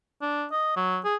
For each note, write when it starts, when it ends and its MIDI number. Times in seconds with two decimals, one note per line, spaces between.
0.22 0.45 62
0.52 0.73 75
0.76 0.99 54
1.04 1.16 68